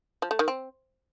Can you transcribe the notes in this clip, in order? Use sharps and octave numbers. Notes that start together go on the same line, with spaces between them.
F3
A3
D#3
C4